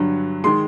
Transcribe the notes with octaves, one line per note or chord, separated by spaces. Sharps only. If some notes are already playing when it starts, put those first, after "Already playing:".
Already playing: G2 D3 F#3
D#3 G#3 C6